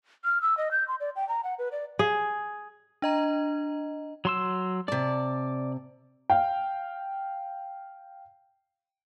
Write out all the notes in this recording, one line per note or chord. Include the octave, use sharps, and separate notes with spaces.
F6
E6
D#5
G6
C6
D5
G5
A#5
F#5
B4
D5
G#4
D4 D#5 A#5
F#3 C6 E6
C3 D5 A5
F5 G5